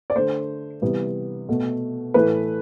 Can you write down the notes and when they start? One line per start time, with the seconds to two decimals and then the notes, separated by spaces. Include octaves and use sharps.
0.10 D5
0.15 D3 A3 C5
0.82 C3 E3 G3 B3
1.49 B2 A3
2.14 A2 E3 A3 B4